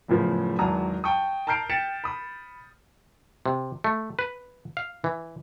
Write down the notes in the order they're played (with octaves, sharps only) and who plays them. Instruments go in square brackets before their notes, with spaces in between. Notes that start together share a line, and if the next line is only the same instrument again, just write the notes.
[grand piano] F#1 A2 C#3 F3 B3
G#1 E2 F#3 A5 A#5 D#6
G5 A5 C#6 D#6
A5 A#5 F6 G6 C7 D7
G5 A6 B6 C#7 D7 E7
B5 D#6
[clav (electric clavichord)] C3
A3
B4
F5
E3